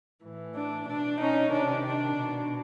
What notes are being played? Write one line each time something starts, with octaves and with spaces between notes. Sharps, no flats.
A2 E3
D4
B2 D4
C#4 D#4
C3 D#3 D4
D4
B2